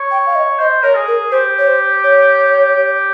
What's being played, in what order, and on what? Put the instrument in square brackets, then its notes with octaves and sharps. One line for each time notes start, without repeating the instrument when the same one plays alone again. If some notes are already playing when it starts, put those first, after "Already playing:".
Already playing: [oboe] C#5
[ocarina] G5
F5
D#5
[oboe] C5 [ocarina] D#5
[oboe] A#4 [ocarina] C#5
[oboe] G#4
[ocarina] A#4
[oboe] G4 [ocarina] C5
[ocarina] C#5
C5
C#5
[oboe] G4